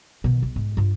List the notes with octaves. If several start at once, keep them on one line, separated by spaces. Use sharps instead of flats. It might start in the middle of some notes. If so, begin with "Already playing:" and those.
B2 D#3
B1
G#2
G2 F4